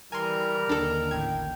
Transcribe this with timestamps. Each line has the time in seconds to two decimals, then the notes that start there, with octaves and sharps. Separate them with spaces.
0.12 E3 G3 A#4 G#5 A#5 C6
0.69 D#2 D3 D4 A4
1.11 A1 G5 G#6